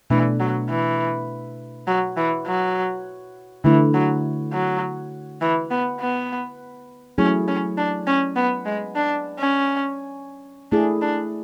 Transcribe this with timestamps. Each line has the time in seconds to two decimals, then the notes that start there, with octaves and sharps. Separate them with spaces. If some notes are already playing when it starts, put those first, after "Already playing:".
0.10 B2 E3 A3 D4
0.40 F#3
0.69 E3
1.87 F#3
2.17 E3
2.47 F#3
3.64 D3 E3 A3 E4
3.94 F#3
4.53 F#3
5.41 E3
5.71 B3
6.00 B3
7.18 F#3 A3 C#4 E4 G#4
7.48 C#4
7.77 D4
8.07 C#4
8.36 B3
8.65 G#3
8.95 D4
9.39 C#4
10.72 A3 D4 E4 G#4
11.02 D4